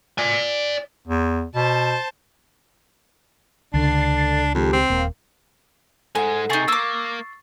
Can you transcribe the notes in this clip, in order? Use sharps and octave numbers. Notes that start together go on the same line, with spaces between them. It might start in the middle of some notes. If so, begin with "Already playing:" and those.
D5 G#5
E2
B2 C5 A5
C#2 D3 D4 A6 C7
F2 D#3 G#3 G4
C4
D#1 A#3
G#2 G#3 A4 F#5 G#5
C3 D#4 G#4 C#6 A6 C7
A#3 D6 E6